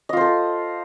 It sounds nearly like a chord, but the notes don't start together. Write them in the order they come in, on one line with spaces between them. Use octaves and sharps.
D#5 F4 C5 A4